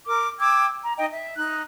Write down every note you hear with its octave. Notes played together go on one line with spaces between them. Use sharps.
A#4 D6
G5 D6 E6 G#6
A#5
D#4 D#5 G5
E5
D#4 F#6